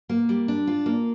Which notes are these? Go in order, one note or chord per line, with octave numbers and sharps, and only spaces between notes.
A#3
G3
D4
F4
A#3